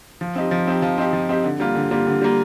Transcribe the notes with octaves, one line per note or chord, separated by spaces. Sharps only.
F3
C4 D#4 G4
F3
C4 D#4 G4
F3
C4 D#4 G4
F3
C4 D#4 G4
D3
G3 A#3 F4
D3
G3 A#3 F4
D3
G3 A#3 F4